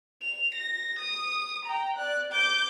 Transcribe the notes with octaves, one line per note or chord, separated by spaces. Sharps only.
F7
A#6
D#6
G5 A#5
D5 F#6
D6 G6